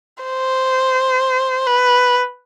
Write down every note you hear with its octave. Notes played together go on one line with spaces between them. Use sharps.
C5
B4